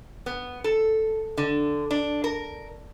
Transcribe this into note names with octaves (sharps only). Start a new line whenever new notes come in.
B3
A4
D3
D4
A#4